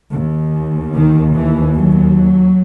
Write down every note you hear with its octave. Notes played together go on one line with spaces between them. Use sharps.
D#2
D#3
E3
F#3